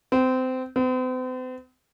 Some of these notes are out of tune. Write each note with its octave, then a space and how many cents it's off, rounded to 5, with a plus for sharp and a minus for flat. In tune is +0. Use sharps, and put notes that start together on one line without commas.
C4 -25
C4 -45